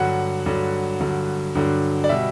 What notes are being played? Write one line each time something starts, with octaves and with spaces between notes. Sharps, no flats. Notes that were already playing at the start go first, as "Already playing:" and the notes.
Already playing: G2 D3 F#3 F#5
G2 D3 F#3
G2 D3 F#3
G2 D3 F#3
D5
B2 G3 E5